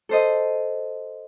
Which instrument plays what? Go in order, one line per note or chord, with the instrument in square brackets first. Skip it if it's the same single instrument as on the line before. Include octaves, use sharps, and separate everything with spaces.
[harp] A4 C5 D#5